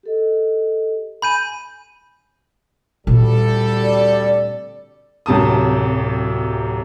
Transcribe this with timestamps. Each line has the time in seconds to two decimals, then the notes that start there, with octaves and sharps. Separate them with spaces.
0.03 G4 A4 D#5
1.22 G#5 B5 G6 D#7
3.07 D2 A#2 G3 C4 A4
3.84 D5
5.26 D1 F#2 C3 A5 D#6